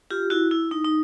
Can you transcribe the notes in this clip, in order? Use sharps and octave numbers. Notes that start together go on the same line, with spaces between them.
F4 G4
E4 F#4
E4
D#4
D#4